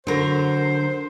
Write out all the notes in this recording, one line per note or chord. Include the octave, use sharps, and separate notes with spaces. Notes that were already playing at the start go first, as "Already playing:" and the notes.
D3 F#3 A#4 C5